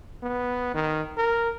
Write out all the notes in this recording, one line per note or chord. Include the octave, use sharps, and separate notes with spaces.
B3
D#3
A#4